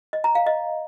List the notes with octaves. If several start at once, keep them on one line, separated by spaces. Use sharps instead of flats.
D#5
A#5
F5
D#5